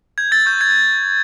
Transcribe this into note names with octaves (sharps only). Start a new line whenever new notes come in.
G6 G#6
E6 A6
C#6 G6
G6 G#6